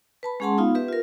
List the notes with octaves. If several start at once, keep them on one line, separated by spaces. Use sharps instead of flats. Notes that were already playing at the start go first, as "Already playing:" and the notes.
B4 A5 B5
G#3 C#4 G#4 F#5 A5 C6
B3 D#4 F4 F5
G4 B4 E5
F4 A#4